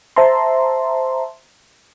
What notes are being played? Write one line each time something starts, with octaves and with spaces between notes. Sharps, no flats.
C5 E5 A5 A#5 C6